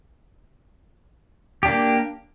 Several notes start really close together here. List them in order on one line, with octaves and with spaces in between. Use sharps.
G4 D4 A#3